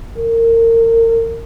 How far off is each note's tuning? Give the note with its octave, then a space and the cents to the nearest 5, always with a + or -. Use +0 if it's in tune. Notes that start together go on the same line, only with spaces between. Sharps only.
A#4 -30